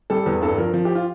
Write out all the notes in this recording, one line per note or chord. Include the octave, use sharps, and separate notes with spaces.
G3 A4
E2
G2 A4
F3 A#4
F3
G4
F4